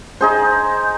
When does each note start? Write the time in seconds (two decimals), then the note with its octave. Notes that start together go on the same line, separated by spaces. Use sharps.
0.21 D#4 G#4 C5